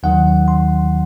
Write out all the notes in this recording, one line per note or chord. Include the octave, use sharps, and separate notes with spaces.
D#2 D#3 F#3 F#5
C6